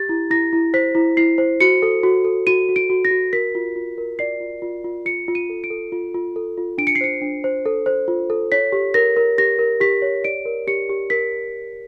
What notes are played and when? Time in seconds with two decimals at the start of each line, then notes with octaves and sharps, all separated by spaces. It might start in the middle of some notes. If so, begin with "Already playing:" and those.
Already playing: G4 A6
0.09 E4
0.30 E4 A#6
0.53 E4
0.74 C5 B6
0.95 E4
1.17 E4 C7
1.38 C5
1.60 F#4 C#7
1.82 A4
2.03 F#4
2.25 A4
2.47 F#4 D#7
2.69 F#4
2.76 D7
2.90 F#4
3.05 A#6
3.11 F#4
3.33 A#4 B6
3.55 F4
3.76 F4
3.98 A#4
4.19 D5 C7
4.40 F4
4.62 F4
4.84 F4
5.05 F4 C#7
5.28 F4
5.35 D#7
5.50 A4
5.64 D7
5.70 A4
5.92 F4
6.14 F4
6.36 A4
6.58 F4
6.78 D4 D7
6.87 C#7
6.95 C7
7.01 C5 C#7
7.22 D4
7.44 C5
7.66 A4
7.86 C5
8.08 F4
8.30 A4
8.52 C#5 B6
8.72 G4
8.94 A#4 A#6
9.16 A#4
9.38 G4 A#6
9.59 A#4
9.80 G4 B6
10.02 C#5
10.24 D5 D7
10.45 A#4
10.67 G4 C#7
10.90 G4
11.10 A#4 B6